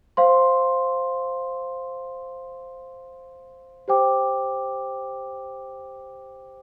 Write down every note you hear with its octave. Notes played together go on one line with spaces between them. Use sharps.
C5 F5 C6
G4 C5 G5 D6